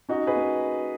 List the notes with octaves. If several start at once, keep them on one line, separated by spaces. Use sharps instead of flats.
C#4 D#4 F#4
G#4 B4
A#3